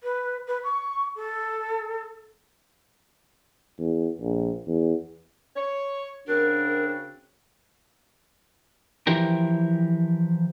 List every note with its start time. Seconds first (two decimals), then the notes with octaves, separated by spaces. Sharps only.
0.03 B4
0.47 B4
0.64 C#6
1.16 A4
3.79 E2
4.21 A#1
4.67 E2
5.56 C#5
6.27 C#3 C4 D4 F#4 A#4
9.07 E3 F3 G4 A#4